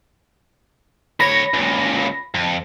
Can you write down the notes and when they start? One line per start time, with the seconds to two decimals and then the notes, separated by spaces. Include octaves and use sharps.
1.20 D2 C#5 B5 A#6
1.54 C#2 A#2
2.34 F2